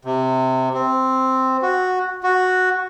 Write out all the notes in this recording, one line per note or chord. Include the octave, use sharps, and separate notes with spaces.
C3
C4
F#4
F#4